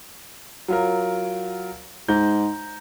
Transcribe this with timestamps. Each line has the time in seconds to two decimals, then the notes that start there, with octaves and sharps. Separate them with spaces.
0.68 F#3 F4 A#4
2.08 G#2 A#5 G6